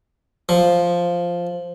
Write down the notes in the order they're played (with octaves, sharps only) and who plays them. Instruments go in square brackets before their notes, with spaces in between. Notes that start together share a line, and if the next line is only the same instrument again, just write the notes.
[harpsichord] F3